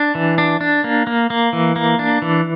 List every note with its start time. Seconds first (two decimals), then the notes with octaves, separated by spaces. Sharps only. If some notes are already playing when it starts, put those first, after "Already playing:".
Already playing: D4
0.15 E3
0.38 D4
0.61 D4
0.84 A#3
1.07 A#3
1.30 A#3
1.53 E3
1.76 A#3
1.99 D4
2.22 E3